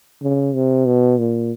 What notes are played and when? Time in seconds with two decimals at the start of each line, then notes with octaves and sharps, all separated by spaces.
0.22 C#3
0.55 C3
0.86 B2
1.18 A#2